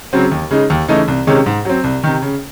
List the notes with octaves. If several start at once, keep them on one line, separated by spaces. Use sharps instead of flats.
C#3 F#3 C4
D#2
C#3 G#3 D#4
D#2
C#3 E3 A3 D#4
C2
C3 D#3 G#3 C#4
G#2
F#3 C4
C2
C3 D#3
C#3